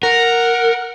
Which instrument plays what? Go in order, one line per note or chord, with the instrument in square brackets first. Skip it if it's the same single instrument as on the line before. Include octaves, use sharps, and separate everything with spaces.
[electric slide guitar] A#4 [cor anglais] F#5